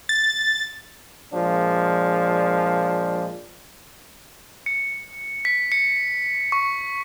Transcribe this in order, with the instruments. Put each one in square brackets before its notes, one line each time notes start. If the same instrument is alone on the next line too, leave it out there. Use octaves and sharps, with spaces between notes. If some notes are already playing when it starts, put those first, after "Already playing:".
[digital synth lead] A6
[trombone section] A#2 F3 G#3 D4
[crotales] C#7
B6
C#7
C#6